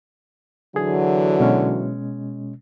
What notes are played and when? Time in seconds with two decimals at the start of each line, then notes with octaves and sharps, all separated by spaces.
0.76 D3 E3 F#3 G#4
1.40 B2 G#3 C#4